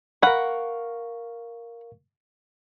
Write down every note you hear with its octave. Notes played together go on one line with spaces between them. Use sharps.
A#4 F5 F#5 B5 C#6